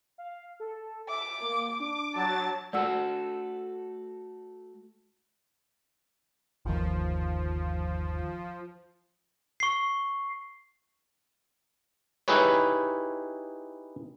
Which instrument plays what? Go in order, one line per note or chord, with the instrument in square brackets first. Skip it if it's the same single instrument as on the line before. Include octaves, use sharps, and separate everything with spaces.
[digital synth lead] F5
A4
[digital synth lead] E5 [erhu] D6
[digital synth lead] A#3
[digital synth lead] D4 [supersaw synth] D6
[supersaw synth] F#3 A6 [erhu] A5
[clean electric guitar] A3 F#4 A4 [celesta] D5 F#5 E6
[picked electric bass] G1 D#2 D#3 [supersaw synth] F3
[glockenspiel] C#6 C7
[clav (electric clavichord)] D#4 E4 G4 G#4 B4 C#5